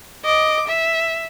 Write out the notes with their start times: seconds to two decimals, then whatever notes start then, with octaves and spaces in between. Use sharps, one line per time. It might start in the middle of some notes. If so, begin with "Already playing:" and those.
0.24 D#5 D6
0.68 E5